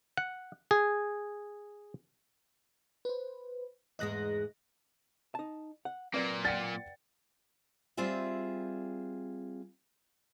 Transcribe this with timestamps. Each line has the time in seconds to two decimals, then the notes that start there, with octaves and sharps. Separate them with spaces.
0.17 F#5
0.71 G#4
3.05 B4 C5
3.99 E2 G#2 G#3 D#5 F#6 A#6
5.35 D#4 A5
5.85 F#5
6.14 A#2 F#3 A#3 C4 B4 D5
6.45 D5 F#5 G5 A6 C#7
7.97 G3 C4 F4 G#4 E5